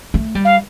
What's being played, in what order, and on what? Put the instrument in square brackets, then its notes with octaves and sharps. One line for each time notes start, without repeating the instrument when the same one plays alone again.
[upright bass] A3
G3
[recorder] F5